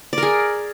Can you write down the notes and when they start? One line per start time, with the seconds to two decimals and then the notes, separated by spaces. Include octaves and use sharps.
0.13 D5
0.18 A#4
0.23 G#4